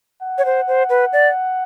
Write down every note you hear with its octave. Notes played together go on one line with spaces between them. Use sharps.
F#5
C#5
C5
C5
B4
D5